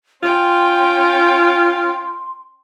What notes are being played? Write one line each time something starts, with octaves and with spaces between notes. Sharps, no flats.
C#4 F4 G5 C6